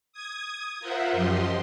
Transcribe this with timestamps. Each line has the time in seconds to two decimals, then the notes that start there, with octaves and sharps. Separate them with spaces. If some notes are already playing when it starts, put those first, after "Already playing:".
0.13 D#6 G#6
0.79 F4 A#4 C5 E5 F#5
1.12 F#2 F3 G4 D#5 C6